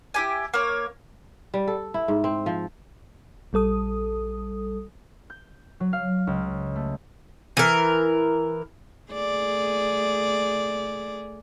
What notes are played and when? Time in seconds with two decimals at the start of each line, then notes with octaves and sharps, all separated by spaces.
0.14 E4 G4 G#5
0.54 A#3 C#5
1.54 G3
1.68 A4
1.94 E4
2.08 G#2
2.24 C4
2.46 F3
3.53 A#1 G3 A4 D#6
5.30 G6
5.80 F#3
5.93 F5
6.27 C#2
6.76 A3
7.57 E3 A#4
9.12 A3 G#4 D5